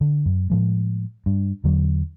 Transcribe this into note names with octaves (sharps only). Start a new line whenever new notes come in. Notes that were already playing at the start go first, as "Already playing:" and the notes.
D3
F#2
A2 F3 G#3
G2
E2 D3 F#3